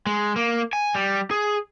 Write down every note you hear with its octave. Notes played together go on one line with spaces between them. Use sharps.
G#3
A#3
G#5
G3
G#4